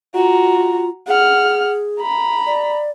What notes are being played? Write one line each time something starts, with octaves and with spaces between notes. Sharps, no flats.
F4 F#4 A#5
G#4 F#5 F6
A#5 B5
D5